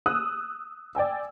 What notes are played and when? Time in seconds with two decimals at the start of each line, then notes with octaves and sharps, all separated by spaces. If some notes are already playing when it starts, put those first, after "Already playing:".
0.06 D#6 E6 F#6
0.95 D5 G5 G#5 E6